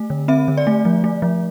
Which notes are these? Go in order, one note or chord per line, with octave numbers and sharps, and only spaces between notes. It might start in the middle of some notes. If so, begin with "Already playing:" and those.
Already playing: A3
D3
C4 E5
D3
D5
A3
F3
A3
F3